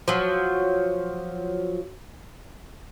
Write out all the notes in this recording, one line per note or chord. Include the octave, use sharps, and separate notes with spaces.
F3 F#3